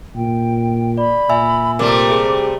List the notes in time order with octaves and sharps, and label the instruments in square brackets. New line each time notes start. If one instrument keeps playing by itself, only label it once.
[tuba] A#2 [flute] G5
[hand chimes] D5 [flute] B5
[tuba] A#2 [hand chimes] E5 G#5 E6
[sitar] C3 G3 A3 [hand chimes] A#4 [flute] D6
[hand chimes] G#4